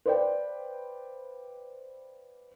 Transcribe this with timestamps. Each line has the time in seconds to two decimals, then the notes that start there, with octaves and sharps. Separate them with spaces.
0.06 B4 C5 D5 F5 G5